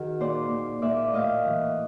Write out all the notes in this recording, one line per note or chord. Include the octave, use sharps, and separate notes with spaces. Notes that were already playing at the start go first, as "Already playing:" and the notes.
Already playing: D#3 F#4 G#4
A#2 C5 D5
A#2
A#2 D5 E5
A2 D#5 F5
E3